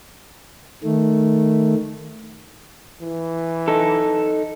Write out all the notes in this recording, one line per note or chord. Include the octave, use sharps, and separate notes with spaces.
D#3 A3
E3
D#4 A4